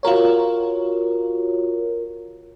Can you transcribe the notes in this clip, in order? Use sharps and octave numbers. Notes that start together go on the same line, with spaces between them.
F4 F#4 A#4 C#5